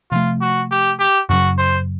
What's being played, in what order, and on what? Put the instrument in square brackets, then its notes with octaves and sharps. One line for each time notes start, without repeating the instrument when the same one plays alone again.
[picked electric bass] C3 F3 A3 [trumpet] F4
[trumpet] F#4
G4
G4
[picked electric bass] F#2 C#3 F#3 [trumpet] F#4
[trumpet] C5